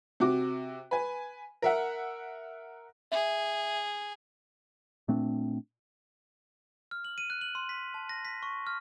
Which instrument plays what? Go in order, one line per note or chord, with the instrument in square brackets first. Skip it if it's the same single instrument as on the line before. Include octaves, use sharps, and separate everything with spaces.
[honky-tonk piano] C3 F#4 D6
B4 G#5
A#4 E5 F#5
[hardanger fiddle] G#4 [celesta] E5
[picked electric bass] A#2 A3 C4 D4
[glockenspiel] F6
F#7
D#7
F#6
F#7
C6
B6
A5
A#6
B6
C#6
F6